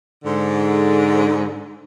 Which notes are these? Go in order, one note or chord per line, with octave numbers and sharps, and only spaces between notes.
G#2 D3